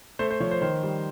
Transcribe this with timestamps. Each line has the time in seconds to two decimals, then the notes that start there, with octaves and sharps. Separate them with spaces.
0.19 A3 C5
0.30 C5
0.40 F3 C#5
0.51 C5
0.61 D#3 C5
0.83 G3